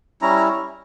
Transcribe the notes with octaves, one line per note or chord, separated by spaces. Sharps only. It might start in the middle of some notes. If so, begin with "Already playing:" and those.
G3 C#4 E4 A#5